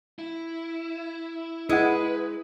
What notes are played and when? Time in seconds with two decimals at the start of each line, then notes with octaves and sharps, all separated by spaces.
0.19 E4
1.69 G#3 E4 B4 F#5 D#6 E6